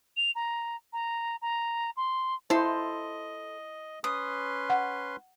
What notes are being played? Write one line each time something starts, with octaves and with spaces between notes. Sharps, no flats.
F7
A#5
A#5
A#5
C6
E4 A4 C5 D#5 C6
C#4 B4 C6 D#6
F#5